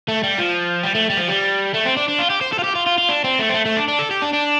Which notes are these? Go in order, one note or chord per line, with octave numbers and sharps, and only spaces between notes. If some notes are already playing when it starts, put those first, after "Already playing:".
A3
G3
F3
G3
A3
G3
F3
G3
A3
C4
D4
D4
F4
G4
C5
A4
F4
G4
F4
F4
F4
D4
C4
A3
C4
A3
A3
D4
D4
A4
G4
D4
D4